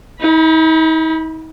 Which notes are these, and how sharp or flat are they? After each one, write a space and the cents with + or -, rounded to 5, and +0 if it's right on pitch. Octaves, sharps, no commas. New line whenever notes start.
D#4 +45 B5 -15